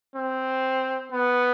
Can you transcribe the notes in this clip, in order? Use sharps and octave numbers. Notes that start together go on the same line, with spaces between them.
C4
B3